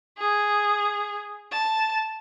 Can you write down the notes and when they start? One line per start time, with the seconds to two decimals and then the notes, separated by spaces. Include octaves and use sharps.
0.18 G#4
1.52 A5